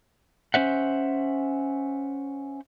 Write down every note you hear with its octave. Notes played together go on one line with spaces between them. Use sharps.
C#4 C5 E5 F#5